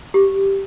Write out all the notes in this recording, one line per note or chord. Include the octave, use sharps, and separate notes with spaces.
G4